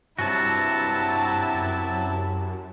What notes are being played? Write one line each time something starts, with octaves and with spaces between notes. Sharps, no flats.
G2 C3 F#3 E4 F#4 A5
F#2